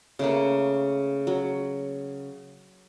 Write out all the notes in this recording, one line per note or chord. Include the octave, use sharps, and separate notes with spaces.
C#3 A3 A#3
F#3